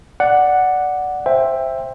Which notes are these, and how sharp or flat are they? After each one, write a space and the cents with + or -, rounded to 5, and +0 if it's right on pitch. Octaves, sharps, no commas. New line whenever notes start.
D5 +0 F#5 +0
C5 +10 E5 +5 G5 +20